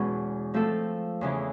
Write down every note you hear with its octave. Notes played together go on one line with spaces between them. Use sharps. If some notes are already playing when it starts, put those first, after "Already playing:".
Already playing: E2 B2 G#3 C#4
F3 A3 C4 F4 A4
E2 C#3 E3